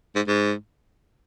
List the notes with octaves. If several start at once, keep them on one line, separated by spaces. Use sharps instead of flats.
G#2
G#2